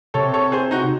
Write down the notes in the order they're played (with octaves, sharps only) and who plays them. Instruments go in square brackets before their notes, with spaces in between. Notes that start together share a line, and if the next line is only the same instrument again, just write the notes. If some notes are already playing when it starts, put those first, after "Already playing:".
[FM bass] C3 [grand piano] A4 C#5
[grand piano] A4 C#5
G#4 C5
D#4 F#4